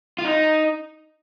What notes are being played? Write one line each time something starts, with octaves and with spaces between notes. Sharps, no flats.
F4
D#4